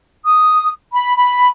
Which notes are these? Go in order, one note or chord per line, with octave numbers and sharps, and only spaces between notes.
D#6
B5
B5